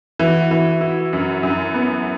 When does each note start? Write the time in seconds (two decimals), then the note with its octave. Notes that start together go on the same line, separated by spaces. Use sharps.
0.19 E3 F#4
0.51 E3
0.81 E4
1.13 F#2
1.43 F#2
1.74 B3